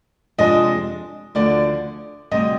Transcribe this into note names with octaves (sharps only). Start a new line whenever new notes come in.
F2 C3 F3 G#3 D4 D#5
D2 D3 F3 D5
D2 C3 G3 D#5